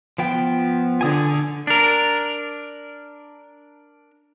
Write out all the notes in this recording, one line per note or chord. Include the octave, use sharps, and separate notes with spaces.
F3 B3 G5
D3 G#5 D#6
D4 A#4